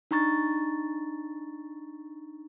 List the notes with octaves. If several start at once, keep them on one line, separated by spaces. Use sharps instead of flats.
D4 D#4 A#5 C#6 A6